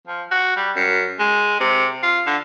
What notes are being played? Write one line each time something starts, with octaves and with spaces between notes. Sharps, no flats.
F3
F#4
G3
F#2
G#3
C3
F4
D3